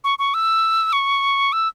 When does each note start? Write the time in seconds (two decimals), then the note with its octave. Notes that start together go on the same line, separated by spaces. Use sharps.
0.04 C#6
0.19 C#6
0.34 E6
0.93 C#6
1.52 E6